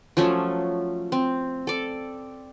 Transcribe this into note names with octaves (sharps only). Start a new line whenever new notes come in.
F3 F#3 A3 C#4
C4
A4 D5